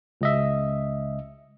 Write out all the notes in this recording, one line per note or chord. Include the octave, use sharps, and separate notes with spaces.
C#2 D#5 E5